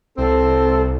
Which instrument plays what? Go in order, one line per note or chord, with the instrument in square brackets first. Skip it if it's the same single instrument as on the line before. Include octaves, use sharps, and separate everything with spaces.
[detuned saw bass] C2 [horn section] C4 [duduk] A4